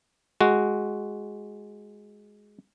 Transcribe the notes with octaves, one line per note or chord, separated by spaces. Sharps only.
G#3 F#4